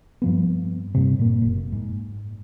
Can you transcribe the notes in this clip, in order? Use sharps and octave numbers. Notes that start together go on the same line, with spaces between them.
G2 F3 B3
G2 C3
A#2 A#3
F#1
G#2